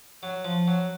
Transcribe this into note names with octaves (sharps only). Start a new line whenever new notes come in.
F#3
F3
F#3